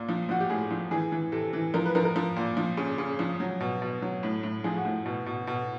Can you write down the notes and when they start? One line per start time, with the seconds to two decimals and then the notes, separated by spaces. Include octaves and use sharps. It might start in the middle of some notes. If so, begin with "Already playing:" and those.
Already playing: A#2
0.09 F3
0.29 F3 F#4
0.40 G4
0.50 A2 G#4
0.71 F3
0.91 E3 G#4
1.12 E3
1.32 C3 A4
1.53 E3
1.74 F3 A#4
1.86 B4
1.95 F3 A#4
2.05 A#4
2.16 F3
2.36 A#2
2.57 F3
2.77 C#3
2.98 C#3
3.19 F3
3.40 F#3
3.61 B2
3.82 B2
4.02 F#3
4.23 A2
4.43 A2
4.64 F3 G#4
4.77 F#4
4.85 A2
5.06 B2
5.26 B2
5.47 B2